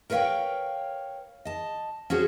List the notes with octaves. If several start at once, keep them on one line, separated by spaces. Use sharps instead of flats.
A#4 B4 C#5 D#5 F5 G5
D#5 A5
C#4 F#4 G#4 C5 F#5